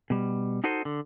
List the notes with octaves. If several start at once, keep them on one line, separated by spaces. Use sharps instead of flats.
B2 G3
D#4 F#4 A4 C5 D#5
D3